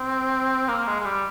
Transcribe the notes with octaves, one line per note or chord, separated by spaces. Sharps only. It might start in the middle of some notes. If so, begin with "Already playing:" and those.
Already playing: C4
A#3
G#3
G#3
G3